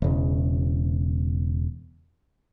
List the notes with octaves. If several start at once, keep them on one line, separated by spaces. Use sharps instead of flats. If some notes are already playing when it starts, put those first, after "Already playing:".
E1 E2 C#3